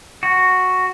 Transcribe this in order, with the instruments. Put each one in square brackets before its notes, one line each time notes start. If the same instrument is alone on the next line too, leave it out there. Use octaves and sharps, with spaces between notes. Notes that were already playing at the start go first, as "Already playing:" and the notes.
[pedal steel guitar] F#4